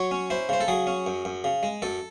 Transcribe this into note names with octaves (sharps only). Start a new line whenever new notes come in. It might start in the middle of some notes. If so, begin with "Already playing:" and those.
Already playing: F#3 C#5
C#4
E4 C5
C#3 C5
A4
F#3 G#4
C#4
F#2
F#2
C#3
G#3
F#2 A4